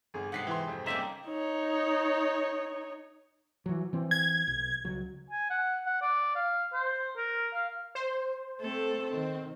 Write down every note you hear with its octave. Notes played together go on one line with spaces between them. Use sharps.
G1 G#4
G#2 C3 G#3 F#5 B6 C7
E3 C6
F2 C4
C#3 G3 A#3 D#4 C5 E5
D#4 C#5
E3 F#3
E3 C4
G#6
B1
C#2 F#3
G#5
F#5
F#5
D5
F5
C5
A#4
F5
C5
A3 C4 A4
D#3 C4